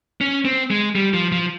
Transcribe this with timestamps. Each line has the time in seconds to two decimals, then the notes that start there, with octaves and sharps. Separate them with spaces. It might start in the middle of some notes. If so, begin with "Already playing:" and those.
0.21 C#4
0.45 C4
0.71 G#3
0.95 G3
1.14 F3
1.32 F3